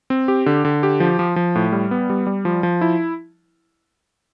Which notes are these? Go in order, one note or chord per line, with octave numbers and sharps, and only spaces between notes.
C4
G4
D3
D3
G4
F3
F3
F3
A2
G3
B3
G3
G3
F3
F3
E4